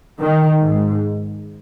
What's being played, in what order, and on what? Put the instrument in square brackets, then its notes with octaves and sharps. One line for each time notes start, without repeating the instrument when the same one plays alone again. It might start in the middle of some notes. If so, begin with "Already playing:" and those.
[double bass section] D#3
G#2